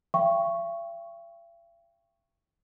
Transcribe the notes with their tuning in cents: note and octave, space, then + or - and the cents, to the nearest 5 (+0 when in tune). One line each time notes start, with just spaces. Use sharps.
E5 +45 G5 +0 C#6 -5